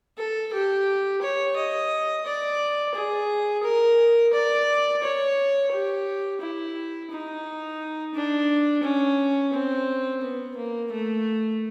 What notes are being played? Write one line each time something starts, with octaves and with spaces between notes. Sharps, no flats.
A4
G4
C#5
D#5
D5
G#4
A#4
D5
C#5
G4
E4
D#4
D4
C#4
C4
B3
A#3
A3